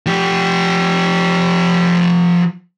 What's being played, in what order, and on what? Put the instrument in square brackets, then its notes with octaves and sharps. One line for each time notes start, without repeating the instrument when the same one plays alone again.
[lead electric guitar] F3 G4